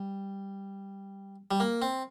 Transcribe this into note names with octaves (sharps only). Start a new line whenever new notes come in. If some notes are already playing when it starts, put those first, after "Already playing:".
Already playing: G3
G3
A#3
C4